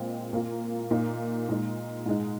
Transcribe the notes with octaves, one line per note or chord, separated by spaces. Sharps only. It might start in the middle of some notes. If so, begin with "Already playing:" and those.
Already playing: A#2 G#3 C4 F4
A#2 A#3 F4
A#2 A#3 D#4
A#2 G#3 D#4
G#2 G#3 D#4